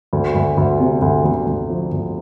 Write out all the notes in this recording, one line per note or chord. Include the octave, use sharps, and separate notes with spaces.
D2
D2
D2
C3
D2
D2
D2
F3
D2